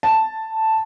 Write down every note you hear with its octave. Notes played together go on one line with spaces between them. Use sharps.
A5